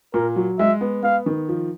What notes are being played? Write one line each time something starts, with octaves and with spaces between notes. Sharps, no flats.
A#2 A#4
F#3
G#3 E5
B3
B3 F5
D#3
F3